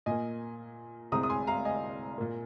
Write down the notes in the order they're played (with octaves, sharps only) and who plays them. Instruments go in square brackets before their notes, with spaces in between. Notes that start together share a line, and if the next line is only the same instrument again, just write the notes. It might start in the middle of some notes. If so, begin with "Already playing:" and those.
[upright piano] A#2 A#3 D#5 G#5
C2 C3 G#3 C4 A#5 D#6
D#6
G#5 C6
F5 A#5
D#5 G#5
A#2 A#3